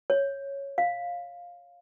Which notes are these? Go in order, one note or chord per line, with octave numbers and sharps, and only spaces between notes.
C#5
F5